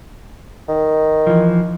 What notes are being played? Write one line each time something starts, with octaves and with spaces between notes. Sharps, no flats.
D#3
E3 F3